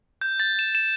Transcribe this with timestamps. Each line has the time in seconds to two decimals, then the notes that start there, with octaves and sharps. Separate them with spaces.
0.21 G6
0.40 A6
0.59 E7
0.75 E7